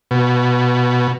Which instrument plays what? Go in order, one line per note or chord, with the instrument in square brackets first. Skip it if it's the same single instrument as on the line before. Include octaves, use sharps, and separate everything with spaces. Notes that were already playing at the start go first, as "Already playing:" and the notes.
[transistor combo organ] B2